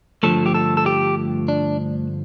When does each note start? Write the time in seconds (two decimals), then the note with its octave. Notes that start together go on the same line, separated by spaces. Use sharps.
0.23 G2 D3 F3 A3 A4
0.46 G4
0.55 A4
0.77 A4
0.86 G4
1.48 D4